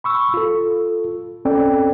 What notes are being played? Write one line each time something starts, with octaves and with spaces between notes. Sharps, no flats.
B5 C#6 E6
F4 A4
C4 C#4 A4 D5 G5